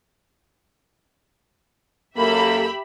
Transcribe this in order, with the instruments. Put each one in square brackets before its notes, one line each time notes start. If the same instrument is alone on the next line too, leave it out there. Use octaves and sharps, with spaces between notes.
[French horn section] F#2 A#3 A4 [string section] G4 E5 B5